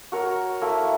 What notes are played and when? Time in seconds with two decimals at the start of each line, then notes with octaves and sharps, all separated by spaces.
0.12 F#4 A#4 C#5
0.62 A3 A#3 E4